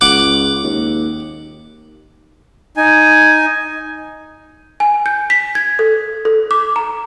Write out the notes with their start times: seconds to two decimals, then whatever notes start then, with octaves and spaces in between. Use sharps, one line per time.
0.01 C#2 F#5 D6
0.63 D#2
2.77 D#4 G#5
4.80 G#5
5.06 G6
5.30 B6
5.55 G#6
5.79 A4
6.25 A4
6.51 D6
6.76 A#5